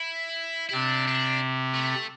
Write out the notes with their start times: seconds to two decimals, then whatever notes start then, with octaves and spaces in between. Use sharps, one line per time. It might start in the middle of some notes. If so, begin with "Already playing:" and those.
Already playing: E4
0.69 E4
0.73 C3 C4 D4
1.08 D4
1.75 A3